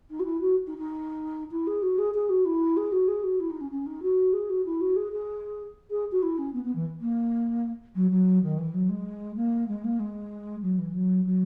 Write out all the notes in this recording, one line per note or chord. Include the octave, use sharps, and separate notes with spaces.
D#4
F#4
E4
F#4
D#4
D#4
E4
G#4
F#4
G#4
G#4
F#4
E4
G#4
F#4
G#4
F#4
E4
D#4
C#4
C#4
D#4
F#4
G#4
F#4
E4
F#4
G#4
G#4
G#4
F#4
E4
C#4
B3
B3
E3
A#3
F#3
F#3
D#3
E3
F#3
G#3
A#3
G#3
A#3
G#3
F#3
E3
F#3
F#3